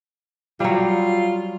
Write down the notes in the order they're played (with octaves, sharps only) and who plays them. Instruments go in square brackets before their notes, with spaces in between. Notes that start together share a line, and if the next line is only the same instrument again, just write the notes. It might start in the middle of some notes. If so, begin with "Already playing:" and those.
[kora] F#3 G3 [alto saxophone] F4